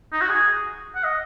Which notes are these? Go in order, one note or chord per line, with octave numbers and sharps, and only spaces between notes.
D#4
F#4
G#4
F#5
D#5